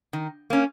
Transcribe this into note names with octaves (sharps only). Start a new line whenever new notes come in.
D#3
A#3 C#4